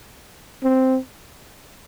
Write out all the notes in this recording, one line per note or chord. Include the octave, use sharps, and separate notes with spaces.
C4